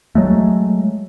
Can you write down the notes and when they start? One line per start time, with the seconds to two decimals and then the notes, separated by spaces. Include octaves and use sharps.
0.15 F#3 G#3 A3